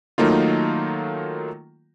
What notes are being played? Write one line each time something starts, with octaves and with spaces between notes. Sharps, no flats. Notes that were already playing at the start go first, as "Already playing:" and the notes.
D#3 F#3 A3 A#3 D#4 F4